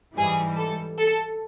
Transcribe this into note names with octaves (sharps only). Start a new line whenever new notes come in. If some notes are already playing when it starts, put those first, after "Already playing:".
G#2 E3 G3 G#4
A4
A4